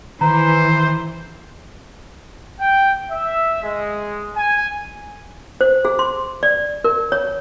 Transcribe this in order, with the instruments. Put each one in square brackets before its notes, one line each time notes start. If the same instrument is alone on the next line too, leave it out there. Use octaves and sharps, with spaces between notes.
[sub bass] D#3 [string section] E3 [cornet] C5 [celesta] A#5
[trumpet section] G5
E5
G#3
G#5
[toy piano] C5
G#4
C6
D5
A#4
C#5